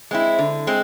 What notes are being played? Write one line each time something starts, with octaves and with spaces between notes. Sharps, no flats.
G#3 C4 E4
D3
G#3 C4